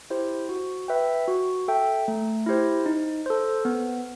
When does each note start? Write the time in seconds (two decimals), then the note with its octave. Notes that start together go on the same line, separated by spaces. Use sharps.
0.10 E4 G4 C5
0.49 F#4
0.88 B4 E5 G5
1.28 F#4
1.68 A4 E5 G5
2.08 A3
2.46 E4 G4 C5
2.86 D#4
3.26 A4 C5
3.65 B3